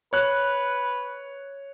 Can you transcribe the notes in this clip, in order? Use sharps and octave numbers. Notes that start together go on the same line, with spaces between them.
B4 C#5 F#6